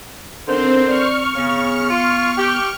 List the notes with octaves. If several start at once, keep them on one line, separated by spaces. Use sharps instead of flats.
D3 D#3 C4 D4 C5
D5 C#6 F6
C#3 B3
F4
G4